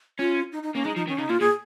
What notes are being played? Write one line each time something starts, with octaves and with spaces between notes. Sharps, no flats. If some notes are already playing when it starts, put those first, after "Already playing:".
C#4 F4
D#4
D#4
A#3 C#4
G#3 D#4
F3 D#4
D#3 C#4
C#3 D#4
A#2 F4
A#2 G#4